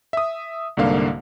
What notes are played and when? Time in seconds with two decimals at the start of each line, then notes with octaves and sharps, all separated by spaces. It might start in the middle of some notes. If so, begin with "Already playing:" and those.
0.13 E5 D#6
0.77 C2 G#2 D3 A#3 F5